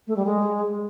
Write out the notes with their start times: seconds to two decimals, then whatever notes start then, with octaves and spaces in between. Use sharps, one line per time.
0.07 A3
0.16 G3
0.25 G#3